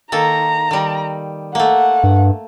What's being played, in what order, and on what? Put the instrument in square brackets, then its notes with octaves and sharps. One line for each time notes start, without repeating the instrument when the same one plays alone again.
[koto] D#3 A#3 A4 [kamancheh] A#5
[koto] D#3 G3
[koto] A3 A#3 [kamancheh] F#5
[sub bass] G2